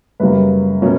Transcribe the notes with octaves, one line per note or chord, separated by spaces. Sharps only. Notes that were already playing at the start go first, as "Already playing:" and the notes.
F#2 C#3 G3 A#3 B4
B2 F#3 A#3 C#4